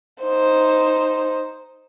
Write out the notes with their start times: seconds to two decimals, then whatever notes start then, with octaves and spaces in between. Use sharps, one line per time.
0.23 D#4 C5